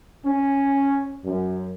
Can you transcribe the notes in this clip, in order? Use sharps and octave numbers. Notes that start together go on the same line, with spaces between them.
C#4
F#2